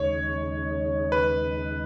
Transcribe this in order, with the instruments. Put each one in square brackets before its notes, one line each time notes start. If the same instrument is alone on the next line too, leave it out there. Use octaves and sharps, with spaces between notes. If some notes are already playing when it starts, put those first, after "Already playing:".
Already playing: [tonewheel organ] D#2 C#3 G#3 D#4 [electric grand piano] C#5
[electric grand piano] B4